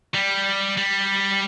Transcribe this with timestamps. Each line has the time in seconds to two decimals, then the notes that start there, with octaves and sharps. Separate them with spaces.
0.14 G3
0.77 G3